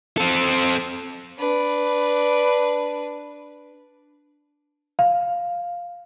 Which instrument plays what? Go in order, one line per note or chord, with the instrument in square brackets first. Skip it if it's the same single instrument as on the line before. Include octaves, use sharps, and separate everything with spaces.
[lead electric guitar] C4 A4
[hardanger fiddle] D4 B4
[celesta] F5